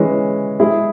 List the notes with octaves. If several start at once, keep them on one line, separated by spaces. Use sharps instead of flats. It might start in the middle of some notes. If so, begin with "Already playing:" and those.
Already playing: E3 G#3 C#4
G#3 E4 G#4